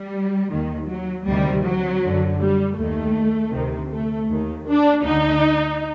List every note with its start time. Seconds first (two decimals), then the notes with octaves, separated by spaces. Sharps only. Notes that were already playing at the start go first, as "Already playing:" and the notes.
Already playing: G3
0.51 D#2 D#3
0.89 F#3
1.27 D2 C3 D#3 G3
1.64 F#3
2.02 F#2 D3
2.40 G3
2.78 D#2 D#3 A3
3.53 D2 C3 D#3
3.91 A3
4.29 D#2 D#3
4.67 D4
5.04 D2 D3 D#4